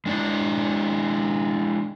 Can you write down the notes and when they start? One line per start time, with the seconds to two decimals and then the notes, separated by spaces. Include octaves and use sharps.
0.06 G#3 D4 E4 D5